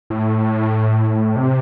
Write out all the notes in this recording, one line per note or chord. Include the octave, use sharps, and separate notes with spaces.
A2
C3